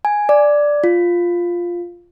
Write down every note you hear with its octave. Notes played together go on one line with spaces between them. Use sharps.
G#5
D5
F4